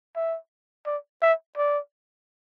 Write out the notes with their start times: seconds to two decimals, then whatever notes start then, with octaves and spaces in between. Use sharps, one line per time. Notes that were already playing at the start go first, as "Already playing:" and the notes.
0.16 E5
0.86 D5
1.22 E5
1.57 D5